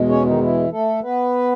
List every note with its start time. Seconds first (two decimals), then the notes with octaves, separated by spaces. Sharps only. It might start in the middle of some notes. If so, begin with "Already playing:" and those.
Already playing: E2 B2 G#3
0.09 C#4 C#5
0.25 D#3 D#4
0.41 E3 E4
0.72 A3 A4
1.03 B3 B4